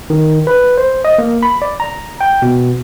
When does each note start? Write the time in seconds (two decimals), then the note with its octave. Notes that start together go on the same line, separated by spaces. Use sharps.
0.10 D#3
0.47 B4
0.78 C5
1.05 D#5
1.18 A#3
1.43 B5
1.62 D5
1.80 A#5
2.21 G5
2.42 B2